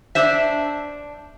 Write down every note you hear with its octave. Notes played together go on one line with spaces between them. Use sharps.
D4 C5 E5